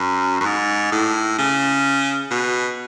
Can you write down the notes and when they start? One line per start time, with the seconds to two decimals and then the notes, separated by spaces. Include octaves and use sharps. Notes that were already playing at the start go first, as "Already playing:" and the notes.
Already playing: F#2
0.41 F#2
0.46 G#2
0.92 A2
1.38 C#3
2.31 B2